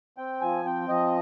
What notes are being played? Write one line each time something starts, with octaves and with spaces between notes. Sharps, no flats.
C4 G5
F3 G#5
C4 G5
F3 D#5